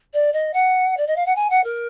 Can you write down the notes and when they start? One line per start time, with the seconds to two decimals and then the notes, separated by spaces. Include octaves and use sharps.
0.13 D5
0.33 D#5
0.53 F#5
0.97 D5
1.06 D#5
1.16 F5
1.26 F#5
1.35 G#5
1.50 F#5
1.63 A#4